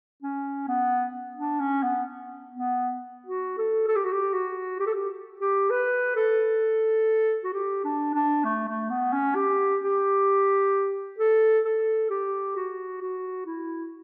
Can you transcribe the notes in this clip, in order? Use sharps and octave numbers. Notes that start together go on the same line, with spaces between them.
C#4
B3
D4
C#4
B3
B3
F#4
A4
A4
G4
F#4
G4
F#4
G4
A4
G4
G4
B4
A4
F#4
G4
D4
D4
A3
A3
B3
C#4
G4
G4
A4
A4
G4
F#4
F#4
E4